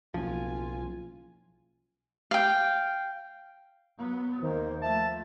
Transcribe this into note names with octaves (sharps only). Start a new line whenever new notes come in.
F#1 B1 F3 F4 G#5
F5 G5
F#3 B3
D#2 D#3 A#3 C5
F3 A3 E5 A5